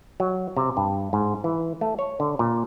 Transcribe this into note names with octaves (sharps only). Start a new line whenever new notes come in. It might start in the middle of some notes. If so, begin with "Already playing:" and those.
F#3
C3
G2
G#2
E3
A3
C#5
D3
A#2